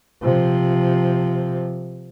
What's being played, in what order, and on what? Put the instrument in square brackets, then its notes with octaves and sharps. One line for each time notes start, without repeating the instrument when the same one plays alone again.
[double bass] C3 F3